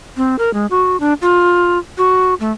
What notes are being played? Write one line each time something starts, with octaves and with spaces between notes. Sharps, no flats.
C4
A#4
G#3
F#4
D4
F4
F#4
A3